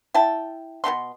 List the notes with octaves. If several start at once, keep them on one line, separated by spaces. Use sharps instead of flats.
E4 G5 A5
B2 D#3 B3 C6